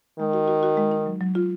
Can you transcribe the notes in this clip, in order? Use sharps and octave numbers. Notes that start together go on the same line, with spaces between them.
D#3 G#3
F#4
F#4
F#4
G#3
D#4
F#3
F#3
F4